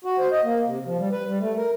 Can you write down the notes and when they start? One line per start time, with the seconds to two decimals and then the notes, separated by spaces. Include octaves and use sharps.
0.05 F#4
0.19 C5
0.32 D#5
0.43 A#3
0.66 C3
0.86 F3
0.98 G3
1.12 B4
1.27 G3
1.41 A3
1.57 A#4